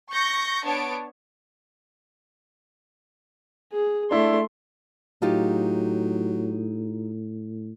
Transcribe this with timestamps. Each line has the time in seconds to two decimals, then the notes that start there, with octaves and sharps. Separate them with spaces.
0.11 C#6 G6 A#6 C#7
0.64 B3 D4 C#5 A5 D7
3.73 G#4
4.11 A3 D4 E4 C6
5.22 A2 F#3 D#4 F4 G4